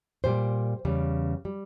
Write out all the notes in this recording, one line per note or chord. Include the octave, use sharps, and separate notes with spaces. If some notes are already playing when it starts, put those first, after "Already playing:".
A#2 G3 C5
E2 C#3 G3
G3